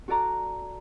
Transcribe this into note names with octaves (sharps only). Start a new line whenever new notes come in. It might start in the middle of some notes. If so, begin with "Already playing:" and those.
F#4 A4 D5 A#5 D6